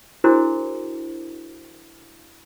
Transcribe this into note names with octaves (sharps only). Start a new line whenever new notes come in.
D4 E4 F#4 G#4 A#4 C5